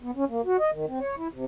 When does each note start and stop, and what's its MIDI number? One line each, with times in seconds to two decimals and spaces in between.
0.03 0.11 59
0.16 0.25 61
0.29 0.42 58
0.45 0.57 66
0.60 0.71 75
0.72 0.86 51
0.87 1.00 60
1.00 1.15 73
1.17 1.28 64
1.33 1.45 48